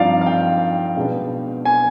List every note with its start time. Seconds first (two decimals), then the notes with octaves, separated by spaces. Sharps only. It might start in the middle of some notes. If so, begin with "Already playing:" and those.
Already playing: G2 F3 C4 D#4 D5 F5
0.21 F5
0.26 G5
0.96 B2 G#3 B3 D4
1.65 G#5